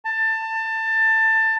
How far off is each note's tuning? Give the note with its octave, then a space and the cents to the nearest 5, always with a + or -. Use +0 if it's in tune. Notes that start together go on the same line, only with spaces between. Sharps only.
A5 +20